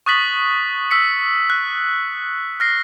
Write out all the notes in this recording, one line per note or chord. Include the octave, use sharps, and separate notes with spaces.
C#6 D#6 F#6 A6 B6 F#7
E6 B6 C#7
F#6
F6 A#6 C7